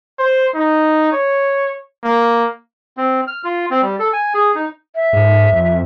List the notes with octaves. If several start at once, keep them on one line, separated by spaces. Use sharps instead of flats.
C5
D#4
C#5
A#3
C4
F6
F4
C4
G3
A4
G#5
G#4
D#4
E5
G#2
F2